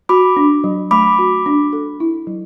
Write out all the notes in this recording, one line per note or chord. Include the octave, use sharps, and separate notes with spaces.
F#4 B5 D6
D4
F#3
A3 B5 D6
F#4
D4
A4
E4
F#3